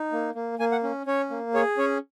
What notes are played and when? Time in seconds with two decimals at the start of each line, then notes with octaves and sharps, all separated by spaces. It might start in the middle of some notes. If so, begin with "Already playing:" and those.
Already playing: D#4
0.12 A#3
0.35 A#3
0.59 A#3 G#5
0.72 F#5
0.83 C#4
1.07 C#4 C#5
1.30 A#3
1.54 G#4 C#5
1.78 C#4 C#5